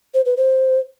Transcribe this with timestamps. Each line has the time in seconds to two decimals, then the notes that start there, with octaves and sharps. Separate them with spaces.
0.14 C5
0.26 B4
0.37 C5